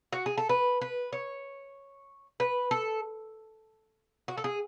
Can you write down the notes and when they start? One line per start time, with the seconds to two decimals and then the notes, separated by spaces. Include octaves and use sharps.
0.13 F#4
0.26 G#4
0.38 A4
0.49 B4
0.81 B4
1.12 C#5
2.40 B4
2.71 A4
4.28 F#4
4.38 A4
4.44 G#4